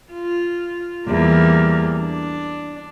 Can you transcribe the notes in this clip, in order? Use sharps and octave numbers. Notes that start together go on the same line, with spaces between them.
F4
E2 G3 A#3
D4